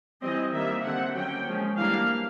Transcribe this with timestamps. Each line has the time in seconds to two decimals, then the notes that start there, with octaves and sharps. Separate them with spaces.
0.22 E3 G3 C4 D#5
0.53 D#3 G3 A#3 E5
0.84 D3 G3 C4 F#5
1.15 F#3 A#3 C#4 G5
1.46 F3 G#3 C#4
1.77 E3 G3 A#3 D4 F5